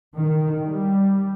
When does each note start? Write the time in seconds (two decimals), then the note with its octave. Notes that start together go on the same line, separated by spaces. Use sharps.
0.16 D#3
0.67 G3